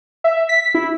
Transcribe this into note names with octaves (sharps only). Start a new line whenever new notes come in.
E5
B6
E4